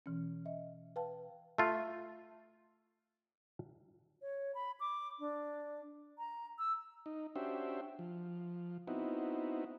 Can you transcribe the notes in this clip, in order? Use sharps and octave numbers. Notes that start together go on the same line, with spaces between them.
B2 E3 C#4
D#5 E5
B4 F5 G5 A5
A3 F4
C#5
B5
D6
D4
A#5
E6
D#4
C#4 D4 F#4 G4 C5 E5
F3
B3 C4 D#4 E4 F#4